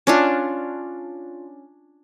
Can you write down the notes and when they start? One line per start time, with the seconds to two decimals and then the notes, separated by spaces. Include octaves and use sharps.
0.07 C#4 D4 F4